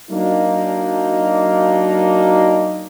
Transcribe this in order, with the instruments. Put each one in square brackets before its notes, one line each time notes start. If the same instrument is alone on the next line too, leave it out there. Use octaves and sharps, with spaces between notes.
[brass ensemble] F#3 A#3 D4 D#4